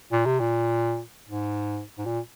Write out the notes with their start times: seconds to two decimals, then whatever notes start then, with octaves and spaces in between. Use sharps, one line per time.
0.12 A#2
0.26 C3
0.40 A#2
1.29 G#2
1.98 G#2
2.06 A#2